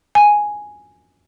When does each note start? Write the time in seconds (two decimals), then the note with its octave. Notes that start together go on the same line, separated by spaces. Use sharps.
0.15 G#5